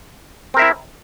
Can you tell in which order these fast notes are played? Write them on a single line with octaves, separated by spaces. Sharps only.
C4 A#4 E5 E4